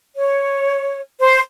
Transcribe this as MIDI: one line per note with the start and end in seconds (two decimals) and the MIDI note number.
0.15 1.01 73
1.20 1.39 72